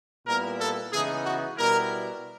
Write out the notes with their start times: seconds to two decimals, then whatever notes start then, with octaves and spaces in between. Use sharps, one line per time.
0.26 A#2 G3 B3 E4 A#4
0.58 A4
0.91 C#3 E3 G#3 B3 D#4 G#4
1.24 F#4
1.57 B2 G3 B3 E4 A#4